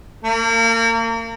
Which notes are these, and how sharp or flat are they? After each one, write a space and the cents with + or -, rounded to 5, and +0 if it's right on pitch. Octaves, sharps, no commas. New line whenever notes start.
A#3 -35